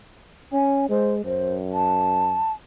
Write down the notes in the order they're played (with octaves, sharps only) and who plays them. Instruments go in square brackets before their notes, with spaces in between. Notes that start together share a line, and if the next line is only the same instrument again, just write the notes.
[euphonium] C#4 [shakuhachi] G#5
[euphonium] G#3 [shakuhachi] C5
[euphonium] F#2 [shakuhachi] C5
[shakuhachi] A5